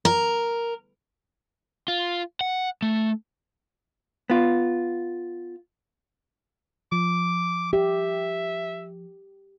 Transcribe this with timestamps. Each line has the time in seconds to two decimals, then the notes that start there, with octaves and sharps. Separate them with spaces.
0.05 A#4
1.88 F4
2.41 F#5
2.82 A3
4.30 B3 F4
6.92 F3 D6
7.73 G4 E5